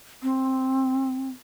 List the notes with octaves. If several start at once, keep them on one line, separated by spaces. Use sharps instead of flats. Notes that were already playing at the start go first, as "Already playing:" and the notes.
C4